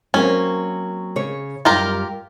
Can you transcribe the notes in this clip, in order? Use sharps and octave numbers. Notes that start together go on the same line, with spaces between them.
F#3 A#3 C4 C#4
C#3 C#5
F#2 G3 F4 G4 A#4